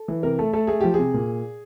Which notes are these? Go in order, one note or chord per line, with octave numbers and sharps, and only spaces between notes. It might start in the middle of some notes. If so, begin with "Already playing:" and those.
Already playing: A4
E3
C3 A#4
A3 A4
A3 A4
A3 G#4
F3 G4
C3 G#4
A#2